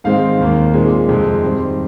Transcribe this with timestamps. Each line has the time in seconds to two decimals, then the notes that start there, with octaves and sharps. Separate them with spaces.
0.04 G#2 D#3 G#3 C4 F5
0.39 D#2 D#3 A#3
0.74 A#2 G#3 C4
1.08 F2 C3 D#3 G#3
1.43 G#2 D#3 G3 C4